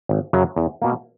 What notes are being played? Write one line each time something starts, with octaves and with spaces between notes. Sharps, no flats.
G#1
F#2 C#3 F#3
E2
B2 A#3